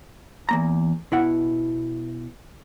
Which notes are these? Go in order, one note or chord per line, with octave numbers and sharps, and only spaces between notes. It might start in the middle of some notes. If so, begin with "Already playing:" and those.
E2 A#3 A#5
B2 E4 F#5